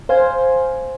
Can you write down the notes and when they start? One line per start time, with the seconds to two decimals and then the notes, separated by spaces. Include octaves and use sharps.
0.09 C5 F5 G#5